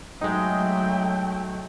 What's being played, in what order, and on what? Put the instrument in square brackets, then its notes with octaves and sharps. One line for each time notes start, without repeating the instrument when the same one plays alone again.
[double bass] F#3 A3 [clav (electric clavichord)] G#3 D#4 [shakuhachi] G5